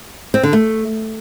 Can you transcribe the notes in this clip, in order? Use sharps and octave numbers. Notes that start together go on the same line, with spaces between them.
C4
D3
A3